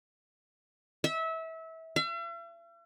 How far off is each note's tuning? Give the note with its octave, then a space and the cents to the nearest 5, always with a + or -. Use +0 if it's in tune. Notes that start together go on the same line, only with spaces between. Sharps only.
E5 -25
E5 +45